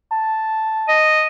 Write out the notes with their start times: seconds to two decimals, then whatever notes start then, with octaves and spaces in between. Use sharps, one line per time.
0.12 A5
0.88 D#5